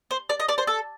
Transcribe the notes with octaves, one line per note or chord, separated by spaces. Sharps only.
C5
D5
D#5
D5
C5
A4